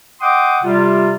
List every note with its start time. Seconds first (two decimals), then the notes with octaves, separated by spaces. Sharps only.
0.20 D#5 F#5 G5 C6 D6 D#6
0.64 C3 G3 F4